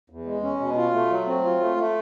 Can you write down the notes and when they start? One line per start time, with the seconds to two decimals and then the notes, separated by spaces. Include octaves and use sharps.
0.10 E2
0.25 G#3
0.43 C#4
0.60 B2
0.77 F4
0.94 A3
1.11 F#3
1.26 C4
1.44 F4
1.61 A3
1.77 A3